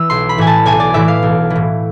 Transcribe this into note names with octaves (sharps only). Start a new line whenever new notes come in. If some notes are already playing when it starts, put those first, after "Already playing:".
Already playing: E3 E6
B1 C6
B5
A2 E3 G#5
A5
B1 G#5
D5
A2 E3 E5
F5
B1
E3
A2